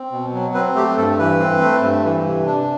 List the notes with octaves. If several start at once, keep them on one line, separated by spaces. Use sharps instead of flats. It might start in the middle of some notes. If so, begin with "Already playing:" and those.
Already playing: C4
B2
F#3
C4 B4
A3 G4
G2 A4
E3 B4
C4
A3
G2
E3
C3
D4